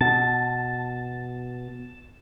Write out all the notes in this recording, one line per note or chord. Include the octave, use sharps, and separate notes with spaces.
B2 A5